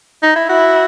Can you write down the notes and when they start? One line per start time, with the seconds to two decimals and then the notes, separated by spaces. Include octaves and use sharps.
0.23 D#4
0.36 E4
0.49 E4 F#4